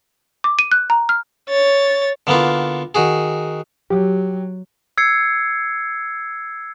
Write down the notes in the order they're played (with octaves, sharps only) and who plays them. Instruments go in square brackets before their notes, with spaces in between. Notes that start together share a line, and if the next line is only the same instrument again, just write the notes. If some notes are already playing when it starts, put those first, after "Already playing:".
[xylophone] D6
D#7
F#6
A#5
F6
[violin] C#5 A6
[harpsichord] D3 A#3 B3 E4 F4
D#3 F#4 G#4
[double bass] F#3 [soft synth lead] G4
[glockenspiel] E6 G#6 C7 C#7